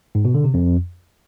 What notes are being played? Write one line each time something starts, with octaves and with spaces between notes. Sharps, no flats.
G#2
B2
D3
C3
F2